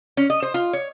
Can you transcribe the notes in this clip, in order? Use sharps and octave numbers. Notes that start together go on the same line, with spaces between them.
C#4
D#5
C5
F4
C#5